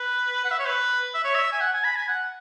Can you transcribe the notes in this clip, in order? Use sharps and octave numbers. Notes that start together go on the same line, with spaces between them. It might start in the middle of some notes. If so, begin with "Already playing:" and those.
Already playing: B4
F#5
E5
C#5
B4
E5
C#5
E5
G#5
F#5
G#5
B5
G#5
F#5